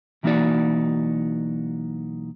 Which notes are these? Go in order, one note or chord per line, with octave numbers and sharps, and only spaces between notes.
B1 E3 A#3 D#4 F#4 D5